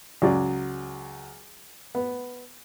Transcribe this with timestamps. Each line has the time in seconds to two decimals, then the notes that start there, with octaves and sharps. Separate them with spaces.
0.22 C#2 F#3 D5
1.95 B3